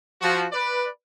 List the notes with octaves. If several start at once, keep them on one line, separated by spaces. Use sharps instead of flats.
F3 F#4
B4 D5